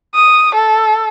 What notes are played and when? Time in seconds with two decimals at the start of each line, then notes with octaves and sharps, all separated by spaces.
0.15 D#6
0.55 A4